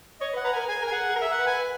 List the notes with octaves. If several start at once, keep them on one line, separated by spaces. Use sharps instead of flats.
C#5 D#5
B4
F#5
B4 A#5
A#4 G#5
G#4 G#5
A#4
G#5
G#4 F#5
G#4
A#4
E5
F#5
B4
G#5